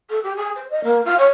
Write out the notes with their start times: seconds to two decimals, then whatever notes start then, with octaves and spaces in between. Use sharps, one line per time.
0.09 A4
0.23 G4
0.36 G#4
0.55 C5
0.70 D#5
0.83 A#3
1.05 F4
1.18 C#5